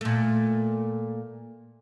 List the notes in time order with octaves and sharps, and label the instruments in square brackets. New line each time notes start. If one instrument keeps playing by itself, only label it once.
[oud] A#2 A3